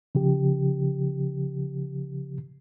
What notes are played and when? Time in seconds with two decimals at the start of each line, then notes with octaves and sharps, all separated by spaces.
0.15 C#3 F3 G4